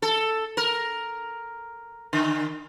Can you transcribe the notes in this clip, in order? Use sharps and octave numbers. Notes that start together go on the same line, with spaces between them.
A4
A#4
D3